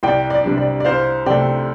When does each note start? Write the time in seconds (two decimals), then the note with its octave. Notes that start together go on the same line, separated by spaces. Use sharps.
0.03 C2 D5 G5
0.30 D5
0.44 C3 G3 D4
0.58 D5
0.80 D5
0.85 C2 C5 F5
1.26 C3 A3 D5 G5